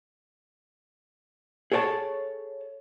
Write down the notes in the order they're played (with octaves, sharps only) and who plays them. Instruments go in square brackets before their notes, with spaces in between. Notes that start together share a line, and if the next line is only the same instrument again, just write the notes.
[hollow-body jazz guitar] G#4 A4 C#5 G5 A5